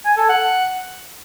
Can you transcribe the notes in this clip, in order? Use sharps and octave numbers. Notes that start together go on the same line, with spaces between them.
G#5
A4
F#5